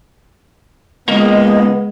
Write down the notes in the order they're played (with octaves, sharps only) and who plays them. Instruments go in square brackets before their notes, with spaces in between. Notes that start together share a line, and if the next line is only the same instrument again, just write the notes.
[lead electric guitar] C#2 A#3 [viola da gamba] G#3 [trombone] B3 [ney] D#5